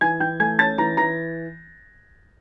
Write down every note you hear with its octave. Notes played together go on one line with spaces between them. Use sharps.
E3 G#5 G#6
E3 G5 G6
A3 G#5 G#6
C#4 A5 A6
E3 A#5 A#6
E3 A#5 A#6